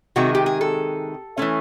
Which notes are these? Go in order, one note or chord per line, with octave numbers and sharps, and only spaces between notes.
C3 D#3 G#3 F#4
G4
G#4
A4
E3 A3 C#4